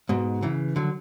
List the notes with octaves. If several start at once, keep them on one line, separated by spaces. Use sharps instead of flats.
G#2 B2
C#3 E3
D3 F#3